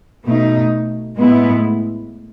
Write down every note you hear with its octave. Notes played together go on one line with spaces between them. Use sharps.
B2 A3 D#4
A2 G#3 B3 E4